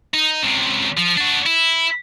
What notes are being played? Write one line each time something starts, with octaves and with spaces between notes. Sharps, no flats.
D#4
C#2 C3
F3
D4 F#4
E4